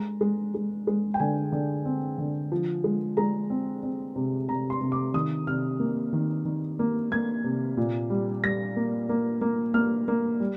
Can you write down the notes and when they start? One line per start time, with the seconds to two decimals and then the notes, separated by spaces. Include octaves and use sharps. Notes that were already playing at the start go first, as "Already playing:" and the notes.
Already playing: G#3 A#5
0.21 G#3
0.54 G#3
0.87 G#3
1.14 G5
1.20 D3 G#5
1.52 D3
1.85 C4
2.18 D3
2.52 F3
2.84 G#3
3.17 G#3 A#5
3.50 C4
3.83 C4
4.16 C3
4.48 C3 A#5
4.70 C6
4.81 C3
4.92 D6
5.14 D#3 D#6
5.47 C3 F6
5.80 A#3
6.13 D#3
6.45 D#3
6.79 A#3
7.11 A#3 G#6
7.44 C3
7.77 A#2
8.10 G3
8.44 G3 A#6
8.76 A#3
9.09 A#3
9.41 A#3
9.74 A#3 F6
10.08 A#3
10.40 G3